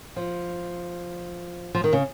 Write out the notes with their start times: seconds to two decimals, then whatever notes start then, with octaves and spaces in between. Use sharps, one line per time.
0.16 F3
1.74 F3
1.84 D#3
1.93 C#3